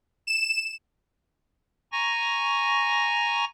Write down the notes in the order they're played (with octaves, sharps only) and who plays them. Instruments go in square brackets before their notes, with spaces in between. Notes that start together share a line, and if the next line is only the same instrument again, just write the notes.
[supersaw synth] E7
[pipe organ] G#5 A#5 C#6 A#6